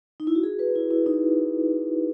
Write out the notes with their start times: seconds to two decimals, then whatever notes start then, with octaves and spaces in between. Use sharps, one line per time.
0.20 D#4
0.27 E4
0.35 F#4
0.43 G#4
0.59 B4
0.76 E4
0.91 E4
1.06 D#4